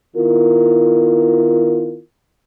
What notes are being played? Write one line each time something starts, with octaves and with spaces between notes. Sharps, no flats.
D#3 B3 E4 F4 A#4